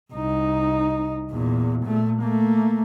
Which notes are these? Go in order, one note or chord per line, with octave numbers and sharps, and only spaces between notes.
C2 D#4
E2 A#2
A#2 A3
A3 A#3